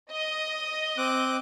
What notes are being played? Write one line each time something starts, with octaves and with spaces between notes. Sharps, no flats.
D#5
C4 D6 F#6